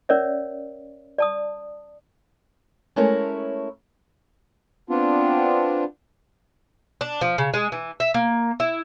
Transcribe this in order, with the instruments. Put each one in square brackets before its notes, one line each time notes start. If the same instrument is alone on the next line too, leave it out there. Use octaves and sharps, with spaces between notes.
[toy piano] C#4 A#4 C#5 D5 E5
D5 A5 D#6
[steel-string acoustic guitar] G#3 A3 C#4 E4 A#4 C#5
[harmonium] B3 C4 D4 F4
[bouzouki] D4
F3
C#3
G#3
E3
E5
A#3
E4